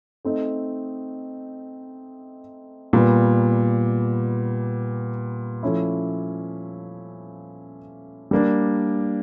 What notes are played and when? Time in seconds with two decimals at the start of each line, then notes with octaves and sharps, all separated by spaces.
0.25 A3 C4 D#4
2.93 A#2 G3 B3
5.63 F3 A3 C#4 E4
8.31 G3 A#3 D4